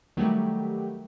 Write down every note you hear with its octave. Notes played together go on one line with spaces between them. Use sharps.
D#3 F#3 G3 A3 G4